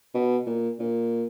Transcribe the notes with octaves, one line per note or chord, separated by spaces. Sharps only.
B2
A#2
A#2